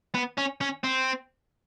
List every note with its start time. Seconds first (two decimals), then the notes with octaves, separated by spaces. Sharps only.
0.14 B3
0.37 C#4
0.61 C#4
0.84 C4